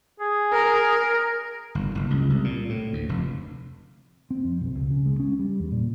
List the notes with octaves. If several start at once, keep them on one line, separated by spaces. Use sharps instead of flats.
G#4
A#4
G1
F#1
C#2
C2
A#2
A2
D2
F1
C4
F2
B1
C#2
C#3
G#3
C#4
G3
E2
A#2